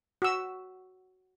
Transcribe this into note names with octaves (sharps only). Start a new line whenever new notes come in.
F#4 E6